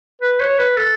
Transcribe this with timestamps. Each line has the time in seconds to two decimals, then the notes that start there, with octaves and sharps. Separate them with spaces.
0.21 B4
0.40 C#5
0.58 B4
0.77 A4